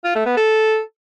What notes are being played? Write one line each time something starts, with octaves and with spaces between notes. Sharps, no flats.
F4
A3
B3
A4